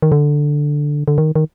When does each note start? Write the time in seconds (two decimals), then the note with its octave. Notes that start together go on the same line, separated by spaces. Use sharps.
0.02 D#3
0.12 D3
1.08 D3
1.18 D#3
1.36 D#3